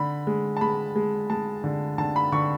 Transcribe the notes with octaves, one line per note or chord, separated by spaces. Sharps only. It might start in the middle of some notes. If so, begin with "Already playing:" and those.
Already playing: D3 B5
G#3
A5
G#3 B5
G#3
G#3 A5
D3
D3 A5
B5
D3 C#6